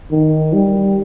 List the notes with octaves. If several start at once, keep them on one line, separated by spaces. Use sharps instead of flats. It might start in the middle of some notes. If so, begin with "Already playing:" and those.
D#3
G3